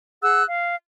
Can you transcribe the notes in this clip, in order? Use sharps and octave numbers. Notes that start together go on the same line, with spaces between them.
G#4 F#5 E6 F#6
F5